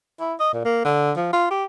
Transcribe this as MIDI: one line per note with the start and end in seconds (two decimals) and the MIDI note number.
0.20 0.34 64
0.40 0.51 75
0.53 0.64 46
0.65 0.81 58
0.85 1.12 50
1.16 1.32 53
1.33 1.47 65
1.51 1.64 67